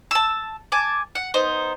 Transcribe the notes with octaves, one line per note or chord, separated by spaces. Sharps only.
A5 E6
G#5 A5 D6
F#5
B3 D#4 C5